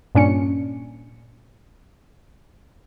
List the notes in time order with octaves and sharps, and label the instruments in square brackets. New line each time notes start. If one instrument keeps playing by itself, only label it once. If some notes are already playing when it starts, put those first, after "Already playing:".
[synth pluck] G2 A#2 C#4 D4 C#7